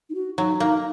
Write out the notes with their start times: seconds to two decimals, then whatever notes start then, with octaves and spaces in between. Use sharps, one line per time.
0.10 D#4
0.15 F#4
0.37 F#3 D#4
0.60 A#3 D#4